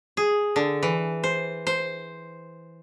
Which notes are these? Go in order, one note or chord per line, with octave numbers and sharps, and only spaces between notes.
G#4
D3
E3
C5
C5